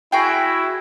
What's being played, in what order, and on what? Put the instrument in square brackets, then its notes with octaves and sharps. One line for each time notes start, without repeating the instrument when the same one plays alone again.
[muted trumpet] E4 [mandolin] F#4 G#4 G5